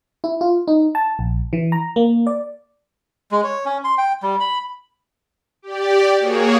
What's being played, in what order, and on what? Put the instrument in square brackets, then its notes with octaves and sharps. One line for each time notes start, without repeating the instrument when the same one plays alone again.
[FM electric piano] E4
F4
D#4
A5
A#1
E3
A#5
A#3
D5
[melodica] G#3
C#5
C#4
C6
G5
G3
B5
[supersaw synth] G4 D5
A#3 F#4 G#4 C#5